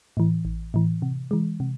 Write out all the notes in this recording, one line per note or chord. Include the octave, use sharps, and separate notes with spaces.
A2 E3
A1
A2 E3
C3
E3 G#3
C3